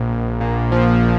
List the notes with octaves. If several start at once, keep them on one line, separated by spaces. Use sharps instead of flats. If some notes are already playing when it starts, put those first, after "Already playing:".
Already playing: A#1
A#1
A#2
F3